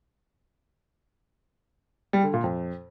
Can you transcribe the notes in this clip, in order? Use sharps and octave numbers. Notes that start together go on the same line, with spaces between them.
G3
D3
A#2
F2